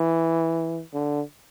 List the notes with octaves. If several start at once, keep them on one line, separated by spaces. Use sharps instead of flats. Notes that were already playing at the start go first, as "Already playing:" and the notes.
Already playing: E3
D3